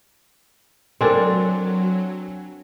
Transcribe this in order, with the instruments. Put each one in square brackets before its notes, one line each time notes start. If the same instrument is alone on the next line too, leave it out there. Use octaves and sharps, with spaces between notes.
[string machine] F#3 [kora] C4 D4 [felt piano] A4 A#4 G#5